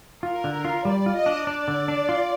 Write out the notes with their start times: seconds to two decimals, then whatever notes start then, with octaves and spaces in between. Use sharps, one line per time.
0.23 F4 A#4
0.44 D3
0.65 F4
0.85 G3 D5
1.06 F4
1.16 D#5
1.26 D4
1.47 D4 D5
1.68 D3
1.88 D4
2.09 F4